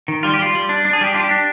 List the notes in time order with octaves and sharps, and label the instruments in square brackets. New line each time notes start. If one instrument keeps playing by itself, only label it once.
[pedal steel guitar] D#3
G3 F4
G4
G3 F4
G3
D4
D4
G#4
G3 G4
D4 F4
G4
D4